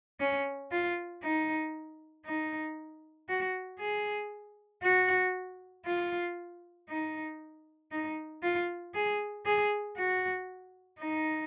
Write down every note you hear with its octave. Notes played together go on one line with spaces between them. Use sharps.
C#4
F4
D#4
D#4
F#4
G#4
F#4
F4
D#4
D#4
F4
G#4
G#4
F#4
D#4